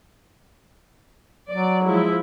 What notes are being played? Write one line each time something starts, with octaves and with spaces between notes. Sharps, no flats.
F#3 D5
F3 G#3 E4